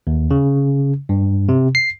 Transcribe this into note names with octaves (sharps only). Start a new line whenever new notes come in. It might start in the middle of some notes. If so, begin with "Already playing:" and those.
D#2
C#3
G2
C3
C7